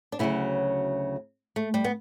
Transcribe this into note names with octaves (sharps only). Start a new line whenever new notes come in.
D4
D2 C#3 F#3 E4
A3
G3
B3